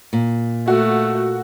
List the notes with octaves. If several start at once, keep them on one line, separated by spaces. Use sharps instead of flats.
A#2
A3 F#4